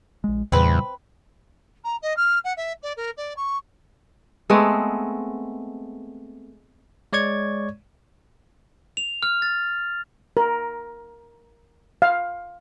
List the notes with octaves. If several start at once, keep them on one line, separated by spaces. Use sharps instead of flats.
A#1 G#3
E2 A#2 C#3 G3 C4 B4
A#5
D#5
F6
F#5
E5
D5
A#4
D5
C#6
G#3 A3 B3 C4
G#3 C#5 D5 C#6 G#6
F7
F6
A6
A#4
F5